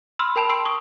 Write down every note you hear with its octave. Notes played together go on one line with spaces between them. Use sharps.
B5 C6 E6 F6
A#4 G5 A5 B5 F7
C6 E6 C7 D7
C#6 D#6